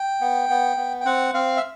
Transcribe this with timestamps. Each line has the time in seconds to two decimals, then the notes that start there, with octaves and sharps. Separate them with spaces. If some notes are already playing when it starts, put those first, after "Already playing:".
Already playing: G5
0.21 B3
0.50 B3
0.77 B3
1.01 G5
1.06 C4 F#5
1.34 C4 F5
1.56 E5